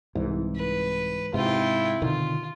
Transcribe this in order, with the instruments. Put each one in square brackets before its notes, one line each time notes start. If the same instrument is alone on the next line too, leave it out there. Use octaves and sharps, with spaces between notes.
[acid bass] C2 [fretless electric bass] G#2 E3
[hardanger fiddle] B4
[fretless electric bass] G#2 [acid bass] C3 [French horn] E4 [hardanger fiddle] F4 G5
[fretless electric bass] B2 D3 D#3 [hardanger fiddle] F4